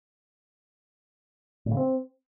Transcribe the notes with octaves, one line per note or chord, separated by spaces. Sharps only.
A2
C#3
C4